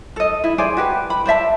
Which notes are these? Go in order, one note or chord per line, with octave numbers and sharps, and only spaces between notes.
A4 D#5
E4
G#4 C5 D5 G#5
F#4 G4 B4
B5
C5 D5 E5 A5